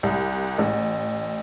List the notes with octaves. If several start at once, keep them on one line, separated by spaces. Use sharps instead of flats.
C2
A1